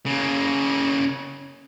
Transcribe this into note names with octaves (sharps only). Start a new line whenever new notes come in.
C#3 A#3